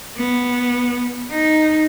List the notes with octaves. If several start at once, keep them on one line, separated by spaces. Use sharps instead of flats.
B3
D#4